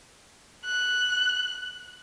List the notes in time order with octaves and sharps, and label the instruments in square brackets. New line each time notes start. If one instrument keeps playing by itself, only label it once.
[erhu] F#6